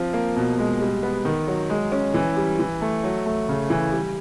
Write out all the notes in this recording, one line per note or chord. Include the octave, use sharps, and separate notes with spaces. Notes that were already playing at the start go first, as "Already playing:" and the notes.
Already playing: F3 C4
A#3
B2
G#3
G3
B3
D#3
F#3
G#3
C#4
E3
G3
E3
A3
F#3
A3
C#3
E3
G3